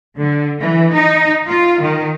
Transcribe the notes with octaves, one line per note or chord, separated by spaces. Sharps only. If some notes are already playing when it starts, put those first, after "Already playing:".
D3
E3
D#4
F4
D#3